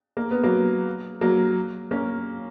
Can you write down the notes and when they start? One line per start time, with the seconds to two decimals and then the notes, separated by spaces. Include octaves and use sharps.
0.17 A#3
0.31 B3
0.44 F#3 A#3
1.21 F#3 A#3
1.91 A#3 C#4